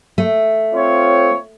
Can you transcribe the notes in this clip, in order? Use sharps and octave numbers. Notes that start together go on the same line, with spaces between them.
A3
C4 F4 C#5